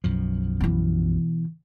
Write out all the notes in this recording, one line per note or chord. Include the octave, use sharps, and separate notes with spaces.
B1 F#2 F3
B2 E3